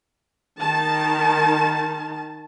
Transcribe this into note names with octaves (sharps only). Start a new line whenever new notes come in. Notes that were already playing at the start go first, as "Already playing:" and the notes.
D#3 A5